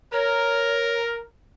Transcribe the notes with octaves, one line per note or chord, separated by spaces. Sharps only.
A#4 C#5